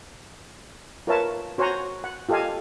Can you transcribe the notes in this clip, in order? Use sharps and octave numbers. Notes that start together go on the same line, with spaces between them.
F4 A#4 B4 C#5 E5 A5
F#4 C5 C#5 F#5 G#5 A#5
F#5
F4 G4 A4 D#5 F5 G#5